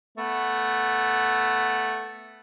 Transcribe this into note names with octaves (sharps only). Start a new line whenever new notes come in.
A3 B3